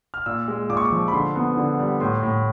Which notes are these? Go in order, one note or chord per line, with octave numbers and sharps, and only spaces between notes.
F6
A#2 E6
G#3
A#2 D6
C#6
D6
F3
B5
D3 C6
B3
D3
G3
A2 C6
A2